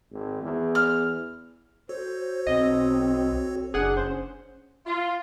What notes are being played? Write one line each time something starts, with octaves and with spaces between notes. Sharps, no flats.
G#1
E2
F6
F#4 A4 C5 C#5
B1 C4 D#5
F#1 D4 G#4 F#5
C#4 C5
F4